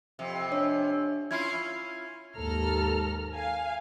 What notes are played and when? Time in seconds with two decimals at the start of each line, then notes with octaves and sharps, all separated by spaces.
0.19 F2 C3
0.52 D4 C#5
1.31 C#4 E4 F4 G#6 C7
2.37 D#2 G#2 A4 A#5 F6
3.33 F5 G#5